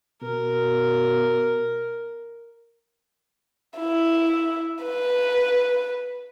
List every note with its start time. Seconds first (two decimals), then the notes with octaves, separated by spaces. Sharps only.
0.22 B2 A#4
3.78 E4
4.84 B4